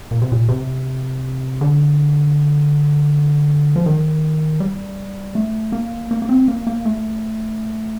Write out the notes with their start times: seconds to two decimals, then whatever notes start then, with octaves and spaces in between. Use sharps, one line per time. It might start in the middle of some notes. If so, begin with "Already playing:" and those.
0.11 A#2
0.22 C3
0.32 A#2
0.48 C3
1.61 D3
3.76 F3
3.86 D#3
4.60 G3
5.35 A3
5.72 A#3
6.11 A#3
6.22 A#3
6.29 C4
6.48 A#3
6.67 A#3
6.85 A3